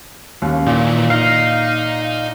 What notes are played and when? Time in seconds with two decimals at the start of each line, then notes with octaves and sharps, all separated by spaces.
0.42 D#2 C#4
0.67 A#2 D#3 E3
1.10 D#4 F5